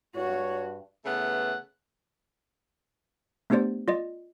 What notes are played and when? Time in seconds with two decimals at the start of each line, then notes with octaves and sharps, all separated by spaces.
0.16 G2 F#4 C#5
1.05 C#3 E3 A3 B3 F#5
3.50 A3 B3 D4 G4 C5 D5
3.88 F4 D5 D#5